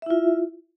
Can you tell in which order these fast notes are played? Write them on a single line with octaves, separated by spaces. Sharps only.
E5 E4 F4